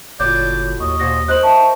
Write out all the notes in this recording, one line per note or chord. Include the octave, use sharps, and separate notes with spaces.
F#1 A2 F#3 F4 D5 G6
D#2 D#5 C#6
A#2 F3 F#4 A#6
D#4 A#4 C5 F#6 F#7
E5 A5 C#6